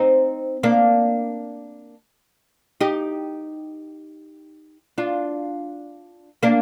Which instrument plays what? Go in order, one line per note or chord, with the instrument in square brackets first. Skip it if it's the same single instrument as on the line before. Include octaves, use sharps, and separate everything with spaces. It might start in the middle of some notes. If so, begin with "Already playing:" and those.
Already playing: [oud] C4 D#4
A#3 D4
D#4 G4
D4 F4
A#3 D4